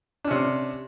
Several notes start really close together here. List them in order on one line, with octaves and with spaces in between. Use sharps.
D4 C#4 C3